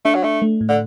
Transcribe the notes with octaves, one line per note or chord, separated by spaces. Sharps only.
A3 D4
F#3
A3 D4
A3
A2
D3